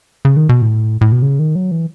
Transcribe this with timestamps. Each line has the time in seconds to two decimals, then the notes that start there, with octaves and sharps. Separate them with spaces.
0.25 C#3
0.37 D#3
0.49 B2
0.62 A2
1.01 A2
1.12 B2
1.22 C#3
1.39 D#3
1.55 F#3
1.71 E3